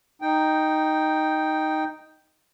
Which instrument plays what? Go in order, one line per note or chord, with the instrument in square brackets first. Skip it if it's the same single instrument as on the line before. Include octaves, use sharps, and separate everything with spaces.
[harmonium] D#4 G5